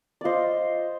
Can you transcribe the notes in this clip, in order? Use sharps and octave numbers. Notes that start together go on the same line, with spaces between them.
F4 C5 D5 D#5